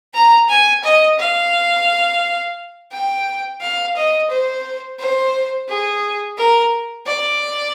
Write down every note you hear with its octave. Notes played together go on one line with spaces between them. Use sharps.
A#5
G#5
D#5
F5
G5
F5
D#5
C5
C5
G#4
A#4
D5